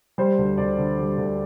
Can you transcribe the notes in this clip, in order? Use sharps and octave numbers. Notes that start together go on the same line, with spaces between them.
G3 C5
D2
D2 D5
D3
G3
D2